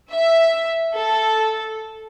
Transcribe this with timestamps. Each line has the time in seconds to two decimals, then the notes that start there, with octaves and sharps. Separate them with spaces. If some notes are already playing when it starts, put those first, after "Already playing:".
0.12 E5
0.95 A4